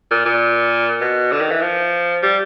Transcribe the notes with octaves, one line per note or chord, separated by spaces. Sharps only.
A#2
A#2
B2
D3
D#3
E3
F3
G3